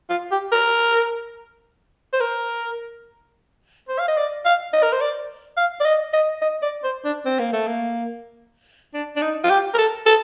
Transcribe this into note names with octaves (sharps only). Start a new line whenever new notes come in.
F4
G4
A#4
C5
A#4
C5
F5
D#5
D5
F5
D#5
A#4
C5
D5
F5
D5
D#5
D#5
D#5
D5
C5
D4
C4
A#3
A3
A#3
D4
D4
D#4
F4
G4
A#4
A4
A4